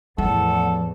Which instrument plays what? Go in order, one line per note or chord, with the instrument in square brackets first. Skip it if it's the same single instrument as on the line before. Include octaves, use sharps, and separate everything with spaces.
[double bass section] E2 A2 [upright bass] F3 [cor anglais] A4 [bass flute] F#5